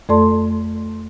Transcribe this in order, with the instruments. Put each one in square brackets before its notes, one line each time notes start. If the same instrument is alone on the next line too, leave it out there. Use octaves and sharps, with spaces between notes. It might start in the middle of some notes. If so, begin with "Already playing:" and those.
[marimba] F2 A3 A4 D5 A5 C6